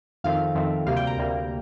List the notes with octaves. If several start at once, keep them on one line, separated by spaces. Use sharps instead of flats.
F2 D#3 A3 C4 F5
F2 D#3 A3 C4
D2 C3 G3 A#3 F5
G5
A#5
D2 C3 G3 A#3